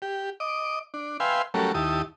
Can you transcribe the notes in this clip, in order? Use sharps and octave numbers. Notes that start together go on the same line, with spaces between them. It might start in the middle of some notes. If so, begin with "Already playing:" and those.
G4
D#5 D6
D4
B4 E5 F5 G5 G#5 C6
F#3 G3 A3 C#4 A4 A#4
D#2 E4 G4 A5 D#6